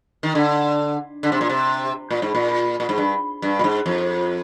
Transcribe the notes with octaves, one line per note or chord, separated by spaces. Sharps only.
D#3
D3
D3
C3
A#2
C3
A#2
G#2
A#2
A#2
G#2
G2
G2
A#2
G#2
F2